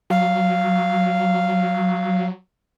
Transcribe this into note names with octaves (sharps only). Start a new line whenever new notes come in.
F#3 F5